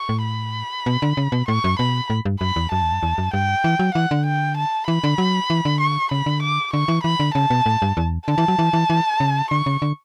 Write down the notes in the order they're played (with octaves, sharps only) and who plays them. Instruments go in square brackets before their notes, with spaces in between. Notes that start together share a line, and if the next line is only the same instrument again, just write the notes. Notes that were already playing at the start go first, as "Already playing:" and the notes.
Already playing: [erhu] C#6
[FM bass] A2
[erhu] B5
[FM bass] B2
D3
C#3
B2
[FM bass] A2 [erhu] C#6
[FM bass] F#2
[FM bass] B2 [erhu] B5
[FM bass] A2
G2
[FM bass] F#2 [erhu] B5
[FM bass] E2
[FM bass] F#2 [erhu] A5
[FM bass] E2
F#2
E2
F#2
[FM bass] G2 [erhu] G5
[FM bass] E3
F#3
[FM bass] E3 [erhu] F#5
[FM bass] D3
[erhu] G5
A5
[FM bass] E3 [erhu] B5
[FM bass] D3
F#3
E3
D3
[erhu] C#6
[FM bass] C#3 [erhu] B5
[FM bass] D3
[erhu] D6
[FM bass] D3 [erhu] C#6
[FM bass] E3
[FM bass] E3 [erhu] B5
[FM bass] D3
[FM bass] C#3 [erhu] A5
[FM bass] B2
A2
G2
E2
[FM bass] D3 [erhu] A5
[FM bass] E3
F#3
E3
E3
E3
C#3
[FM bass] D3 [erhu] C#6
[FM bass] C#3
D3